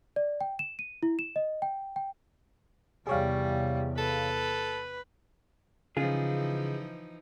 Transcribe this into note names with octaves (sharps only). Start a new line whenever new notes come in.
D5
G5
E7
D#7
E4
E7
D#5
G5
G5
E2 C3 G3 G#4 C#5 F5
A4 B4
C#3 E3 F3 D#4 F4 G#4